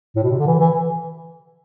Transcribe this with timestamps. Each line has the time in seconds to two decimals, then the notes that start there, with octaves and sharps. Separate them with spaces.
0.16 A2
0.23 B2
0.31 C3
0.39 D3
0.47 E3
0.60 E3